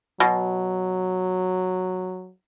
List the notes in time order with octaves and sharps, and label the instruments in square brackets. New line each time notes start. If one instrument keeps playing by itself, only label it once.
[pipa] B2 [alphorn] F#3